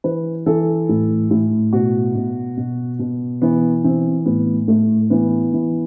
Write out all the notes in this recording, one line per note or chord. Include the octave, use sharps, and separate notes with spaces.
E3 B4
E3 A4
A2
A2
B2 F#4
B2
B2
B2
E3 B3
E3 C4
A2 B3
A2 A3
E3 B3
E3